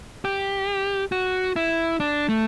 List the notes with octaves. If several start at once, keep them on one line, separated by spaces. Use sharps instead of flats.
G4
F#4
E4
D4
A3